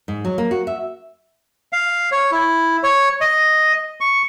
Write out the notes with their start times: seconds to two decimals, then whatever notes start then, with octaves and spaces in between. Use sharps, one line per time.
0.08 G#2
0.25 F#3
0.38 A#3
0.51 F#4
0.67 E5
1.73 F5
2.12 C#5
2.32 E4
2.83 C#5
3.21 D#5
4.01 C#6